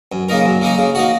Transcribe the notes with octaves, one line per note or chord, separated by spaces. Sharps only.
F#2
C#3 A#3 D#4 A#4
F#2
C#3 A#3 D#4 A#4
C#3
A#3 D#4 F#4